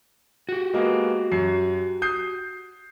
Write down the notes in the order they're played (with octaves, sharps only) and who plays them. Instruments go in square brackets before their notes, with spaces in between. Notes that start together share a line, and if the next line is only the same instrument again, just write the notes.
[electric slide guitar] F#4 G4
[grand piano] G#3 A#3 B3
F#2 C7
D#6 G6 C7